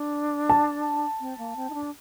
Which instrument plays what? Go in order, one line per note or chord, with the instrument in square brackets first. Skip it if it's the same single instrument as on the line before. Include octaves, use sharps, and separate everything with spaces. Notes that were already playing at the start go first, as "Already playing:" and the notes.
Already playing: [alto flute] D4
[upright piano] A5
[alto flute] C4
A#3
C4
D#4
D4